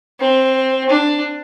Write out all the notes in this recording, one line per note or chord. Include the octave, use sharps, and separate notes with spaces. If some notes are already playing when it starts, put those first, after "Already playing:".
C4
D4